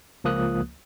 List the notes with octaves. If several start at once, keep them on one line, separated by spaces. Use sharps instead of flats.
C#2 F3 A#3 D#6 F#6